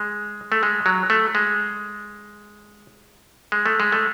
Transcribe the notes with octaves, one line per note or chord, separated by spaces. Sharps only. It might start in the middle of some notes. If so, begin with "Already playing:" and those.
Already playing: G#3
A3
G#3
F#3
A3
G#3
G#3
A3
G#3
A3